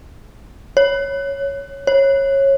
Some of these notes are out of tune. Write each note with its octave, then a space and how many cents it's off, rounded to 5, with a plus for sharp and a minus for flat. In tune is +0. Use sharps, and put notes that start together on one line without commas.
C#5 +0
C#5 -20